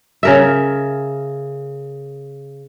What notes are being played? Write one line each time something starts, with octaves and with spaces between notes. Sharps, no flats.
C#3 A#4 E5